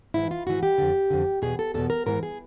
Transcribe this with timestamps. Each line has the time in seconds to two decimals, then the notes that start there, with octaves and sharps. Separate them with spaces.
0.14 G#2 E3 E4
0.31 F4
0.47 G#2 E3 F#4
0.63 G4
0.78 F2 D3
1.10 F2 D3
1.42 E2 B2 G#4
1.59 A4
1.74 E2 B2 A4
1.90 A#4
2.06 G#2 E3 A#4
2.23 G#4